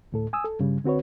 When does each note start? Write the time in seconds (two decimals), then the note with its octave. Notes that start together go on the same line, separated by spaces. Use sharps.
0.12 D2 A2 A4
0.33 G#5 D#6 E6
0.44 A4
0.59 G2 C#3 G3
0.84 D3 C4 F#4 B4 C#5